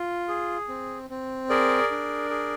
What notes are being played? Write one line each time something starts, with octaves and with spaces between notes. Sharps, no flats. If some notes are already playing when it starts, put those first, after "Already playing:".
Already playing: F4
G#4
C4
C4
G#4 A#4 D5
D4
G#4